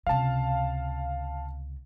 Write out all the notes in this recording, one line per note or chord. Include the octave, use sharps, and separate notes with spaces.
C#2 C3 F5 A5